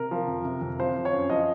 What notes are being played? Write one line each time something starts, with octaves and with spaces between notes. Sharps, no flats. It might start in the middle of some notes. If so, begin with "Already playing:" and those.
Already playing: C3 A#4
F3
F2
C3
F2
F3 C5
F3
C#5
F#2
F3 D#5